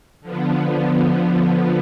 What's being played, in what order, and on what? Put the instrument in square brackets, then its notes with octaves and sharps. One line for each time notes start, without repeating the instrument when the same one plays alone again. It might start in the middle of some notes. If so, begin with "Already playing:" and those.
[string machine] D3 F3 B3